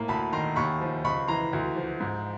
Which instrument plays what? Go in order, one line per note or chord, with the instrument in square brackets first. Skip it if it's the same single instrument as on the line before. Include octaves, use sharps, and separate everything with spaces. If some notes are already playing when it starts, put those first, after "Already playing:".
Already playing: [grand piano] A2 A#3
D2 A5 B5
D#3 A#5 C6
D#2 B5 C#6
F3
C#2 B5 C#6
E3 A#5 C6
D2
F3
G#2